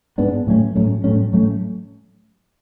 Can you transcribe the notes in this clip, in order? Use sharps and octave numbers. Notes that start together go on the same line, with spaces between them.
G#2 G#3 B3 D4
A2 F#3 A3 C#4
A2 F#3 A3 C#4
A2 F#3 A3 C#4
A2 F#3 A3 C#4